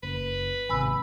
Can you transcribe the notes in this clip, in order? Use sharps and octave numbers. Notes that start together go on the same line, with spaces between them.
F#1 B4
G#1 C3 G#5 B5 E6